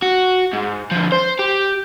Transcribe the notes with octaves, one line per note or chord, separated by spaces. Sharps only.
F#4
G#2
D3 F3
C5
G4